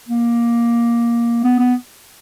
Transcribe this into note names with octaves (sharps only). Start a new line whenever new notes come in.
A#3
B3
B3